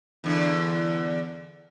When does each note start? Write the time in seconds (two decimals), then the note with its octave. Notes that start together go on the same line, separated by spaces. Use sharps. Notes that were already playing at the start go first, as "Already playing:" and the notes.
0.24 E2 D3